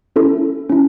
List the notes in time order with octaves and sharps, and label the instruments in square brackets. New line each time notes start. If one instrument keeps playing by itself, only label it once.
[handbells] C#4 E4 A4
C#4 E4